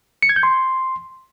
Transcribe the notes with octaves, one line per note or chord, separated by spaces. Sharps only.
C#7
G#6
G6
C6